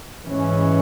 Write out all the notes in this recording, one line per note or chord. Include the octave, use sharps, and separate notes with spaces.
G#2 E3 G#3 C#4